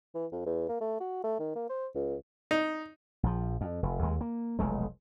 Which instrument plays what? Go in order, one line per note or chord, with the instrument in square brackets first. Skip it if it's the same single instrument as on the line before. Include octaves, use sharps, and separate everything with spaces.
[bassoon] E3
F2
E2
A#3
A3
F#4
A3
D#3
A#3
C5
C#2
[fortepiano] D#4
[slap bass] A#1 F3
F2
F1
D#2 G#3
A#3
F1 B1 G#3 A3